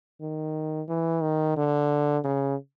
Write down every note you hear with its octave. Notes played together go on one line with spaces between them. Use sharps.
D#3
E3
D#3
D3
C#3